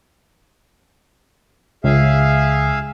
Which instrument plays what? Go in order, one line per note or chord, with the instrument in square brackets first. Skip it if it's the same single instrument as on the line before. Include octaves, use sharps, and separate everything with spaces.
[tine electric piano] C#2 [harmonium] G#4 E5 F5